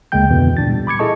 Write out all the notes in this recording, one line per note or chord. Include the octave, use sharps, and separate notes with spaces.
D2 C#3 G#3 A#3 G5 G6
F2 B2 D3 E3 B3
A#2 D4 A6
G3
B5 D6 G#6 C#7
E4 G#4 A4 D#5 A5 C#6